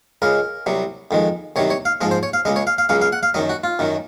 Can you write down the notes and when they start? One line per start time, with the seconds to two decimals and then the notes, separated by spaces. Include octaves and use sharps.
0.22 C#2 C#3 G#3 A#4
0.66 C2 C3 F#3
1.11 F2 D#3 G#3
1.56 C2 C3 D#3 F#3 C#5
1.70 C#5
1.85 F5
2.01 G#2 F3 G#3 D#5
2.11 C5
2.23 C#5
2.33 F5
2.45 C#2 C#3 G#3 D#5
2.56 C#5
2.67 F5
2.78 F5
2.89 C#2 C#3 F#3 F5
3.02 F5
3.13 F#5
3.23 F5
3.34 F#2 D#3 F#3 D#5
3.49 F#4
3.64 F4
3.79 F#2 D#3 F#3